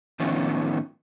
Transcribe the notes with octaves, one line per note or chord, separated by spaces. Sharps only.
A2 D#3 F3 B3 C#4